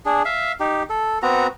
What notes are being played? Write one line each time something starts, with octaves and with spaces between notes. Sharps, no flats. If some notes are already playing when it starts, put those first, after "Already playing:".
D4 G#4
E5 F5
D#4 G4
A4
B3 C4 F#4 A#5